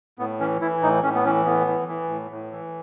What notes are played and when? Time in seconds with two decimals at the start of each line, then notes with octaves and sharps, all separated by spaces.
0.19 A2 B3
0.40 E3 C#4
0.61 E3 E4
0.82 A2 D#4
1.03 A2 C#4
1.15 B3
1.25 E3 C#4
1.46 A2 B3
1.67 E3
1.88 E3
2.09 A2
2.31 A2
2.52 E3